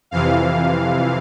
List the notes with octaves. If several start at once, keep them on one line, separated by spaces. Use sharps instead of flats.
F2 C3 E3 F5